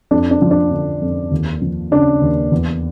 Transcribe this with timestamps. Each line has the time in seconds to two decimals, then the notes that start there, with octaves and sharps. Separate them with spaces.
0.11 F2 D4
0.31 D4
0.42 F3
0.51 D4
0.71 D3
1.01 F2
1.31 D#2
1.61 F3
1.91 C#3 D4
2.21 D#2
2.52 E2